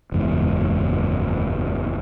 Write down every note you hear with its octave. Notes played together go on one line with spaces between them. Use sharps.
F#1 E2 G#2